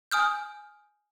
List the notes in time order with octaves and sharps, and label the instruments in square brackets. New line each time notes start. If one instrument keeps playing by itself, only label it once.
[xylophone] G#5 D#6 F6 G6